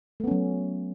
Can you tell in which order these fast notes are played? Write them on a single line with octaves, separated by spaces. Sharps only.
A3 B3 C#4 F#3